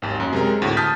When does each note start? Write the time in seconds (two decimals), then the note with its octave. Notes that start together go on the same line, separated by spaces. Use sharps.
0.02 G#1 D#2
0.20 F#2
0.33 C3 G#3 A#4
0.62 D2 A2
0.77 A5 D#6 F6 G6 A6 B6